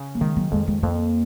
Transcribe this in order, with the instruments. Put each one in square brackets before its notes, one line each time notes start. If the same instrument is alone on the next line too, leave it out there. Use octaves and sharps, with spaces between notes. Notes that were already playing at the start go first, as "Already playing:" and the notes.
Already playing: [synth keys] C#3
[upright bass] A#3
[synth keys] D#3 [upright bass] G#3
[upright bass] F#3
[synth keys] F2 [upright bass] G#3
[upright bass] G#3
[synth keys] F2 [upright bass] A#3